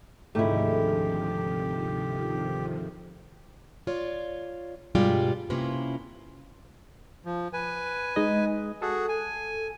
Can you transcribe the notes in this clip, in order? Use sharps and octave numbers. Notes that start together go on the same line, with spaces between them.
D2 G#2 C3 D#3 F3 A3 E4 G4
F4 C#5 D5
G2 B2 G3 G#3 F4 G4
C3 A#3 C#4 E4 F4 B4
F3
B4 G#5
G#3 D#4 D#5
F#4 G#4 A4
G#5